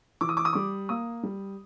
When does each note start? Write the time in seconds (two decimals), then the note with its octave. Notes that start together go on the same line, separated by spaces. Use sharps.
0.21 E3 D6
0.29 D#6
0.37 D6
0.45 D#6
0.53 G3 D6
0.89 A#3 D#6
1.23 G3